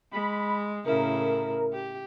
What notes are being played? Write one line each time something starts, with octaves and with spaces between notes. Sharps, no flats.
G#3 B5
A2 C#3 E4 A#4
G4